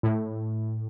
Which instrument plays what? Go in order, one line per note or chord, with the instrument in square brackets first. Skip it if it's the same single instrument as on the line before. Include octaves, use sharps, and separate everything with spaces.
[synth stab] A2